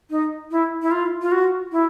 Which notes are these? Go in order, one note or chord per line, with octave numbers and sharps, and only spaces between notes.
D#4
E4
E4
F4
F4
F#4
E4